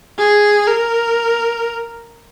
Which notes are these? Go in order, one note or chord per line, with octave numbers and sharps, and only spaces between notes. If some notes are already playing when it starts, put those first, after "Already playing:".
G#4
A#4